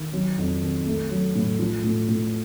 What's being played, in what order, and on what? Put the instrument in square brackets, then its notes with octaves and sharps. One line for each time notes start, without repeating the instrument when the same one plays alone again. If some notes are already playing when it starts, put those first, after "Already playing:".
Already playing: [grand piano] D#3
F#3
F2
D#3
A3
F#3
A2
F3
A2
A2